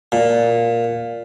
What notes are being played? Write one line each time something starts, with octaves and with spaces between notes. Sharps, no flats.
A#2